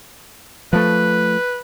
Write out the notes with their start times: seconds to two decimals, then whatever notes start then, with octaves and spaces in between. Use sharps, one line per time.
0.73 F3 A3 B4